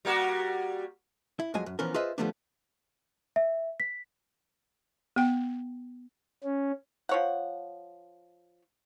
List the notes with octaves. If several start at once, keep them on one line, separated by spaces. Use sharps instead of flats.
G3 A#3 F#4
E4
F2 F#3 G#3 D#5 G#5
F#2
E3 F3 B3 C#4 A#4
F4 G#4 B4 C5 D#5 E5
D3 F3 G3 A3 B3 D4
E5
B6
B3 G5
C#4
F3 C#5 F#5